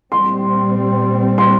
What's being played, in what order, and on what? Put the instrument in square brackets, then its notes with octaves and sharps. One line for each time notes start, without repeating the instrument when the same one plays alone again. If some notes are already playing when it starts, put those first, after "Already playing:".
[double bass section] A#2 G3 C4 [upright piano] C6
[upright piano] C6